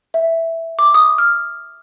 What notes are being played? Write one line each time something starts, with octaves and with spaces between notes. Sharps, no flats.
E5
D6
D#6
F6